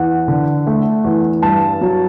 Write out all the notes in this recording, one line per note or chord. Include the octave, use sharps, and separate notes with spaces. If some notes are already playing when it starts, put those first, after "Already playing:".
Already playing: E2 F#5
D3
A3
E2
G2 A5
F#3